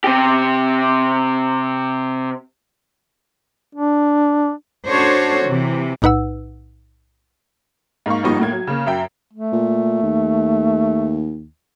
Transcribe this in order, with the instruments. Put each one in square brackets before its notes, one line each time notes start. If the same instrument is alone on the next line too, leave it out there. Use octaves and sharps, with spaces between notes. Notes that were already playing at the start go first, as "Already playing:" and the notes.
[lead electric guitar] C3 G4
[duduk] D4
[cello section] C#4 D4 F#4 A4 C5 C#5
C3 E3
[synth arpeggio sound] B1 A2 D#4 B4 F#5 E6
[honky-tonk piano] G#2 A#3 F5 C#6
G1 F3 G3 A#3 D#4 C#6
A2 A#3 G#6
F#3
C#3 A#3
F#2 E5 G5
[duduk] A3
[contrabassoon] A#2
D#2